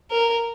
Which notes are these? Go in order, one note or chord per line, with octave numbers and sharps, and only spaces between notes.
A#4